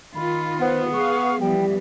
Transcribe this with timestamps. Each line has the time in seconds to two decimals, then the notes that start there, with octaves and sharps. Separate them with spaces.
0.15 D#3 F4 B5
0.60 B3 C5
0.93 G#4 F5 C#6
1.41 E3 F3 G3 B3 G5